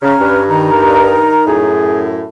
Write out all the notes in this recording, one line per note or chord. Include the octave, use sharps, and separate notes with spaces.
C#3 C#4 A#5 F6
G2 B4
D#3 D#4 A#5
A#4
F#2 A2 G#4